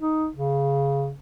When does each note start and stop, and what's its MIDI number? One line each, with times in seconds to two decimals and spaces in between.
0.01 0.28 63
0.35 1.12 49